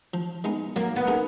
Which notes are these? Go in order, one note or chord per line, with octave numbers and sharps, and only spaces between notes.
F3
G#3 B3 D#4
F#3 A#3
B3
A#3 D#4 G#4